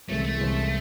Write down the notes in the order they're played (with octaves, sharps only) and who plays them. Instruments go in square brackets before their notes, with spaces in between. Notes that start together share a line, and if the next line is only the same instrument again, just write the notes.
[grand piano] C2 C3 E3 G#3 [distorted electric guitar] A3
[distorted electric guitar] A3
[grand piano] C2 C3 E3 G#3